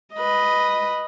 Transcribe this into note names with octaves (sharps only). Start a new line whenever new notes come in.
B4 D#5